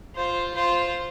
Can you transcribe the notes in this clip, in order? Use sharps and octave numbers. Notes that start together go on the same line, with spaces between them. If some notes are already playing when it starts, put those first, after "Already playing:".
F4 C5
F4 C5